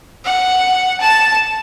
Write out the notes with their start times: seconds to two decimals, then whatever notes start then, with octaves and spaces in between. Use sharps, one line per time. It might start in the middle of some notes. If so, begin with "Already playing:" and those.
0.25 F#5
1.00 A5